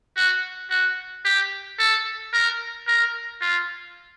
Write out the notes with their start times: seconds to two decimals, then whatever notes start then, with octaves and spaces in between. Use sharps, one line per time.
0.16 F#4
0.70 F#4
1.25 G4
1.79 A4
2.33 A#4
2.87 A#4
3.41 F4